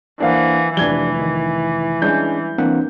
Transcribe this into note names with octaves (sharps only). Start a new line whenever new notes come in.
E3 A#3 D4 C5 F5 F#5
F1 E3 F3 G3 D4 G#6 G7
D#3
G3 G#3 C#4 D4 G6
E3 A#3 C4 D4 F#5